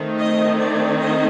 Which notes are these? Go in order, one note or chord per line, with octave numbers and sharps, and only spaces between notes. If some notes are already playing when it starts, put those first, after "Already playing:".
Already playing: D#3 A3 C4 D#4
D#5
D5
D#5